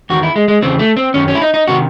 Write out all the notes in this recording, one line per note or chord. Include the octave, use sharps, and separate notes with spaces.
E2 D#3 F#4
E4
G#3
G#3
E2 C#3 E3 C4
A3
C4
F#2 D#3 C#4
C#4
E4
D#4
D#4
C3 D#3 F#4